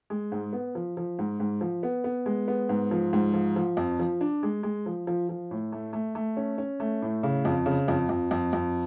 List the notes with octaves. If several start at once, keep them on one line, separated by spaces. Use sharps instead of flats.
G#3
G#2
B3
F3
F3
G#2
G#2
F3
B3
B3
G#3
B3
G#2
F3
G#2
F3
F3
F2
F3
D4
G#3
G#3
F3
F3
F3
A2
A3
A3
A3
C#4
C#4
A3
A2
C#3
F2
C#3
F2
F2
F2
F2